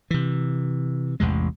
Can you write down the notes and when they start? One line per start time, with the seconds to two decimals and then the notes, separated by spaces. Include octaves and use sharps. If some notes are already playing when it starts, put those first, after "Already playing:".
0.11 C3 E3
1.20 A1 E2 C3 G#3